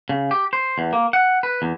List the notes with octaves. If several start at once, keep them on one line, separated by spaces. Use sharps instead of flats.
C#3
G4
C5
E2
A#3
F#5
B4
E2